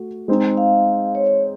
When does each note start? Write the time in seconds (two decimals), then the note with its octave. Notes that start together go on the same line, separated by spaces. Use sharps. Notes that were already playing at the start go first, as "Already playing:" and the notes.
Already playing: A3 F#4
0.28 G#3 C4 D#4
0.57 F5
1.15 C#5